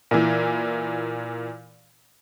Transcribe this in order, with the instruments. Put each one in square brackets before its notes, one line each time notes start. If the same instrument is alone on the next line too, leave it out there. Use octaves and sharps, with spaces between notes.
[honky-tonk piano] A#2 E3